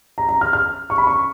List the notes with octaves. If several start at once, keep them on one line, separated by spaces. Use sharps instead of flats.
A#5
A#5
F6
F6
C#6
B5
C#6